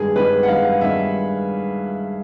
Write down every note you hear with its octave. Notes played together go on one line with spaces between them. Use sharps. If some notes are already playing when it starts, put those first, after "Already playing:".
Already playing: G2 D#3 G#3 B3 D#4 G#4
G2 D#3 G#3 B3 D#4 B4
F#5
G2 D#3 G#3 B3 D#4 F5
G2 D#3 G#3 B3 D#4 E5